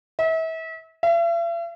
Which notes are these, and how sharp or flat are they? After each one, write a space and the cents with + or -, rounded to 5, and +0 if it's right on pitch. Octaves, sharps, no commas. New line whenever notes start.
E5 -35
E5 +45